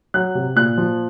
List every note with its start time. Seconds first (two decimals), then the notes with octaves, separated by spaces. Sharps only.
0.14 F#3 F#6
0.35 C3
0.56 A#2 F#6
0.78 F3